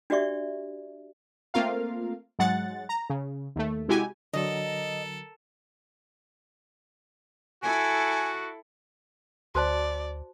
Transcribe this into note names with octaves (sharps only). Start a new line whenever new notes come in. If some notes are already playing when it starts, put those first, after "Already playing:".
D4 F#4 G4 D5 E5 C#6
A3 A#3 C4 F4 A#4 F5
G#2 F#3 G#3 F#5 A6
A#5
C#3
D#2 A3
C3 G#3 E4 F#4 G4 G#5
D3 F#3 A4 A#4 D#5
E4 F#4 A4 G#5
D2 F#4 C5 D5 A5